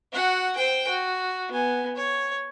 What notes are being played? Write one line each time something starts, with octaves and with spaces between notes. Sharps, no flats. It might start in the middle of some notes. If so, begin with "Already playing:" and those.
F#4 F#5
C5 G5
F#4
B3 G#5
C#5